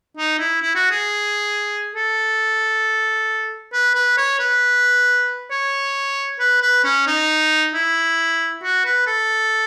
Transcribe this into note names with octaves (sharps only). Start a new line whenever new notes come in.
D#4
E4
E4
F#4
G#4
A4
B4
B4
C#5
B4
C#5
B4
B4
C#4
D#4
E4
F#4
B4
A4